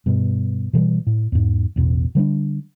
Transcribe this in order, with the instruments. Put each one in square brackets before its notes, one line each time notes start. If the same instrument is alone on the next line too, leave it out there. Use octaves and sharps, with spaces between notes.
[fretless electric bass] G2 B2
B2 E3 F#3 G3
A2
E2 G#2
A1 E2 B2
D3 G3 A3 D4